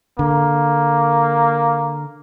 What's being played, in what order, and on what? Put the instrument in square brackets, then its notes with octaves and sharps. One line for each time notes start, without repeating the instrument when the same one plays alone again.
[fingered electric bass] D3 [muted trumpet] A#3